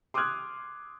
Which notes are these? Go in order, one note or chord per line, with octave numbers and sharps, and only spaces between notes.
C6 D6 D#6 F6 F#6 G#6